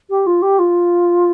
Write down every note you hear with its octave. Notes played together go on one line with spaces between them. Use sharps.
G4
F4
G4
F4